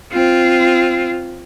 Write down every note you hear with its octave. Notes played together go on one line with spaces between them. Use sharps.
C4 F4